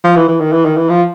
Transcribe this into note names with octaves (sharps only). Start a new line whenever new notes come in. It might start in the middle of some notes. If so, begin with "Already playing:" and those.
F3
E3
E3
D#3
E3
D#3
E3
F3